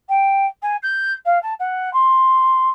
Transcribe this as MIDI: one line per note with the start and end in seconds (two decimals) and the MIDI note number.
0.08 0.46 79
0.62 0.76 80
0.82 1.12 91
1.25 1.41 77
1.42 1.53 81
1.59 1.92 78
1.93 2.69 84